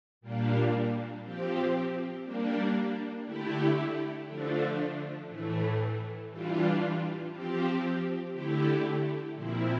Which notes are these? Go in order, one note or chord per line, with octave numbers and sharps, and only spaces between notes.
A#2 G3 A#3 D4
F3 C4 G4
G3 A#3 D4
D3 A3 E4 G4
D3 F3 A3 D4
A2 E3 A3
E3 G3 D4 F4
F3 C4 G4
D3 A3 E4 G4
A#2 F3 C4 E4